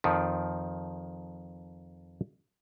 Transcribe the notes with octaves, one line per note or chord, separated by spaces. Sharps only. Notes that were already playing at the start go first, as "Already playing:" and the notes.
F2 D#3 F3